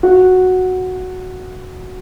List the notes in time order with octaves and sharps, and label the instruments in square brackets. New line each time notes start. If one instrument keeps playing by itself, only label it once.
[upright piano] F#4